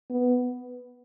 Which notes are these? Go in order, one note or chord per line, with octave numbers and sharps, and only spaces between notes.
B3